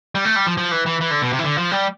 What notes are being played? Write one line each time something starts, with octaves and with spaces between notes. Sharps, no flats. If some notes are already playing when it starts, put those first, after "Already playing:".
G3
A3
G3
F3
F3
E3
E3
E3
D3
B2
C3
E3
D3
F3
G3